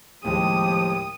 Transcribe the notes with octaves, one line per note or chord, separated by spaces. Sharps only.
D#2 A2 F3 G#3 G4 D#6